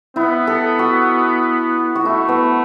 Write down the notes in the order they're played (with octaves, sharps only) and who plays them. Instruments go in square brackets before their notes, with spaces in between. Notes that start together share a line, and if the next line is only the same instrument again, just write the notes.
[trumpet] B3 [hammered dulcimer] E4
[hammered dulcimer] A4
F#4
F#4
[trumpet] A3 [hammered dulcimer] E4
[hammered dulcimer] B3